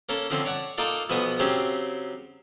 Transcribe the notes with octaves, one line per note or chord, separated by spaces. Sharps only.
A#3 C#4 A4
D3 F3 C4 C#4
C#5 D5 F#5 A5 C#6
A#3 D#4 F4 A4 D5 F5
B1 B2 F3 B3 F#4 D#6
C#3 F#3 C4 C#4 G4